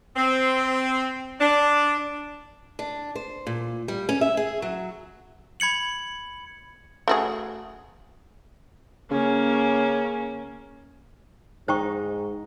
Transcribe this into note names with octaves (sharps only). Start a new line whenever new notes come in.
C4
D4
D4
C5
A#2
G3
C#4
E5
G#4
F#3
B5 G#6 C#7 F#7
A3 F#4 G#4
C#3 A#3 C#4
G#2 D#4 C5 G5 C#6